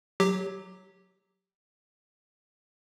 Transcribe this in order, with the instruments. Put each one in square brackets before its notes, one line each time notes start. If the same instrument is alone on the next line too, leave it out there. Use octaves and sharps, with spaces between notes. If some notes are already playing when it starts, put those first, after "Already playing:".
[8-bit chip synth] F#3 G4